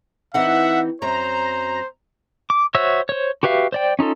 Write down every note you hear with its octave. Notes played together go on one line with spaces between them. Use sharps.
E3 C4 D#4 E5 F#5
F#2 F#3 C4 C5 A#5
D6
F#4 C5 C#5 E5 E6
C5 C#5
F#4 G4 B4 E5 F5
C5 D5 G5
C#4 D#4 F4 A4